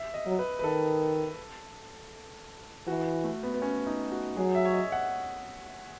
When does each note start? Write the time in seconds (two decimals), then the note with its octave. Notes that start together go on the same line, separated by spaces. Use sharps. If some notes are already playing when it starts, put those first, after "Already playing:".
Already playing: E5
0.14 D#5
0.26 F#3
0.39 B4
0.59 B4
0.64 D#3 A4
2.87 E3 F#4
3.24 A3
3.43 B3
3.54 B3
3.62 C#4
3.87 D#4
4.12 F#4
4.37 F#3 G#4
4.55 E5
4.65 C#5
4.73 D#5
4.92 F#5